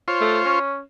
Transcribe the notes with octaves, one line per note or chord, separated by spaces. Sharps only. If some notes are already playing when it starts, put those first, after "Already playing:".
F4 C5 C#5
A3
C#4